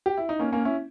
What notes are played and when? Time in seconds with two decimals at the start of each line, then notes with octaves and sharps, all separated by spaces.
0.06 G4
0.17 E4
0.29 D#4
0.39 A#3 C#4
0.52 A#3 C#4
0.65 C#4 E4